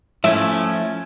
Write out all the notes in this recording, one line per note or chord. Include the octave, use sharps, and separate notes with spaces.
F3 A3 C#4 E4